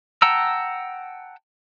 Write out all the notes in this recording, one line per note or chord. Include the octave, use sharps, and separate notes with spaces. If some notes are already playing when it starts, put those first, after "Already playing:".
F#5 G5 A5 A#5 E6